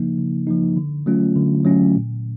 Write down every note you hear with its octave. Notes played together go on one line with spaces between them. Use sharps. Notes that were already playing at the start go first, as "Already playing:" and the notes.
Already playing: C#3 F3 A#3 D#4
C#3
F3 A#3 D#4
D3
F#3 A3 C#4 F4
D3
F#3 A3 C#4 F4
A#2